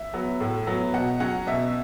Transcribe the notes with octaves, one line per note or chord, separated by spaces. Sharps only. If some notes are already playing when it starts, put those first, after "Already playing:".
Already playing: E5
F#3 B3
A2
F#3 B3
B2 F#5
F#3 C#4 F#5
B2 E5